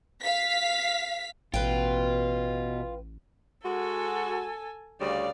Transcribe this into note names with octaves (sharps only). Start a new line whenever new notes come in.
F5 B6
A1 B2 F4 B4 G5
G#3 F#4 A4 G#5
D2 C#3 G3 D5 F5